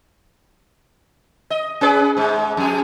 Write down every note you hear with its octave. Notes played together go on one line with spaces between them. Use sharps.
D#5
C#4 G#4 B4
G#2 G#3
F2 G#4